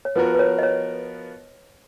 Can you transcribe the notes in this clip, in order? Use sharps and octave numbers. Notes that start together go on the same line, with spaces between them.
C#5
F3 B3 F#4 A#4 B4
B4
C#5
D#5
C#5